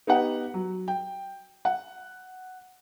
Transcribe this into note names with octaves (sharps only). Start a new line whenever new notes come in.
B3 D#4 G4 F#5
F#3
G5
F#5